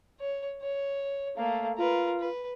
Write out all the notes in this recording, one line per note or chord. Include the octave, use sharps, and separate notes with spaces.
C#5
C#5
A3 A#3 F5
F4 A#4 B4
B4